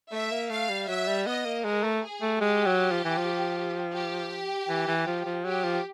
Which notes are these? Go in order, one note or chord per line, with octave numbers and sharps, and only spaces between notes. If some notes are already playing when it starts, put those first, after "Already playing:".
A3 E5
A#3
A3 F5
G3
F#3 E5
G3
B3 D#5
A#3
G#3 A#4
A3
G#4
A3
G#3 G4
F#3
F3
E3
F3
G4
E3
E3
F3
F3
F#3 G4
F3